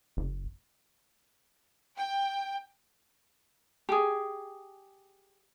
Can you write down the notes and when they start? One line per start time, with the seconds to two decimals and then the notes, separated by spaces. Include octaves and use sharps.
0.17 F#1
1.97 G5
3.89 G4 G#4